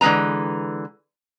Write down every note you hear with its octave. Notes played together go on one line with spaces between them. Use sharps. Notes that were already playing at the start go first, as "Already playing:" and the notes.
D3 E3 G#3 B4 A#5